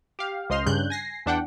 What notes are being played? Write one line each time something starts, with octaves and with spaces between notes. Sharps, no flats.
G4 F5
C#2 C5 D#5 C6 F6
G2 C#3 F#6 G6
G#5 A#6 C7
E2 D4 F#5 G5